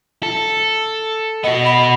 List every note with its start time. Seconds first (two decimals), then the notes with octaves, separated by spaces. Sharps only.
0.23 A4
1.44 B3 F#4 D#5
1.65 B5